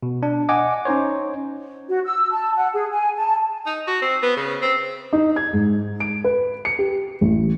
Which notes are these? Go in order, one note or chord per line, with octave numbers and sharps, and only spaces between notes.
B2
D4
D#5 F#5 G#5 D6
C#4 D#4 C5 C#5
F#4
E6
A5
F#5
G#4
G#5
A5
D#4
F#4
C4
B3
C#3
C4
D#4
G#6
G#2
D7
B4
C#7
G4
A1